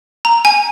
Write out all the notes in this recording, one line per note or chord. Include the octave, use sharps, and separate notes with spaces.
A#5
G#5